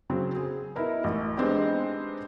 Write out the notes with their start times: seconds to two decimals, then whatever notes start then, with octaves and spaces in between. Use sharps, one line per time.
0.10 C#3 F#3 C4
0.36 G#4
0.75 B3 D#4 E4 A#4
1.04 A1
1.37 G#3 B3 C4 D4 D#4 G4